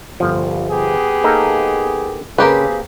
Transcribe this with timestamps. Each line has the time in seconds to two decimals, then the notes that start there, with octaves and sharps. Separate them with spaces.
0.20 G1 C2 F3
0.69 B3 G4 G#4
1.24 A#3 D#4 A4
2.38 C#3 A#3 C4 G4 G#4 B4